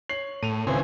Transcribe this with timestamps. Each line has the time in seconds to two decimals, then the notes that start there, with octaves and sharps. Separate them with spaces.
0.09 C#5 C7 F#7
0.43 A2 D#7 F7
0.67 G#1 C#2 C#3 E3 C4 G#5